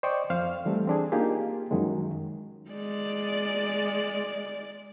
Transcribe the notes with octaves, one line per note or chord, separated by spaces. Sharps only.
C5 D5 D#5 G5 C#6 D6
F2 C5 F5 F6
E3 G3 A3 C4
C4 D4 G#4
A#3 D#4 F4 G4 G#4
F#2 D#3 F#3 G#3
G#3 D5